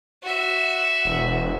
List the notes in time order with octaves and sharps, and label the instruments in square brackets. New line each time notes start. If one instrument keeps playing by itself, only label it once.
[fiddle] F#4 E5
[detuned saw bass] E1